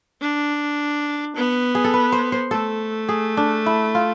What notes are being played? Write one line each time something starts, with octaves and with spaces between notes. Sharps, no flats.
D4
B3
G#4
A4
B4
C5
C5
A3 A4
G#4
D4
E4
F4